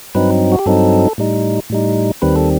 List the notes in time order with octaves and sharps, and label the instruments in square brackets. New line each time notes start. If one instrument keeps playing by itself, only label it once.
[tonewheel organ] G2 F#3 C4 D#4 B4
F#4
G4
G2 F#3 C4 D#4 A4
A2 G3 D#4
A2 G3 D#4
D#2 D#3 G3 C4 B4
A4